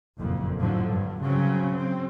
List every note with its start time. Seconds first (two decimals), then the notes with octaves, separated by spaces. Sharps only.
0.19 F#1 F2 A#2
0.58 A2 D3 F3 F#3
0.89 G2
1.23 C#3 F#3 C4 C#4
1.74 C4